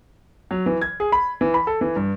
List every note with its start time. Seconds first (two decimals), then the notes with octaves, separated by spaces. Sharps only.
0.51 F#3
0.66 E3
0.81 G#6
1.00 G#4
1.12 B5
1.41 E3
1.54 B5
1.67 A4
1.81 E3
1.96 G2